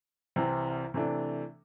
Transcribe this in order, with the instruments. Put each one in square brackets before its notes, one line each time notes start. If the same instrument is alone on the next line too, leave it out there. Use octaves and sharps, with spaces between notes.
[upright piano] C2 C3 E3 C4
C3 E3 A3 D4